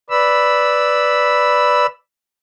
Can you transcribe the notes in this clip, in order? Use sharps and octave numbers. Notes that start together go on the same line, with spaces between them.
B4 D5 B5 E6